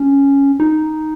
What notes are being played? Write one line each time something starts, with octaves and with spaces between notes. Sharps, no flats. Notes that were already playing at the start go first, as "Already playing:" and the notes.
Already playing: C#4
D#4